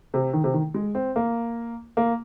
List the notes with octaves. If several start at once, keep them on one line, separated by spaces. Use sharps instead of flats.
C3
D#3
C3
D#3
G#3
C4
A#3
A#3